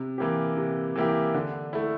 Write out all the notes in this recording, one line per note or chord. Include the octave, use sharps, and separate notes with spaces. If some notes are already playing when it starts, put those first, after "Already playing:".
Already playing: C3
E3 A#3 E4 G4
C3
E3 A#3 E4 G4
D3
A3 E4